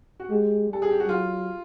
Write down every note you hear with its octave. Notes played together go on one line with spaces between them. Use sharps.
F#4
G#3 G4
G3 A4
G#4
G4
F#4
F#3 F4